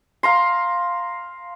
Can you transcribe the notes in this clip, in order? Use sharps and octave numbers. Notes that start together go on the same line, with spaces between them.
F5 A#5 C6